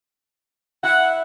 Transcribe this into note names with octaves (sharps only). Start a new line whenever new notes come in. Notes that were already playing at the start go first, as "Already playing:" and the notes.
E4 F#5